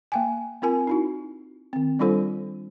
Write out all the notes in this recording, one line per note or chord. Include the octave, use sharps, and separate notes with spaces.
A#3 G5 G#5
C4 F4 A#4 G#5
D#4 E4 F#4
D#3 C4
G3 D4 F4 A4 C5